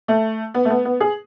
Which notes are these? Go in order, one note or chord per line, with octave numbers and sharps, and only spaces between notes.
A3
B3
A3
B3
B3
G#4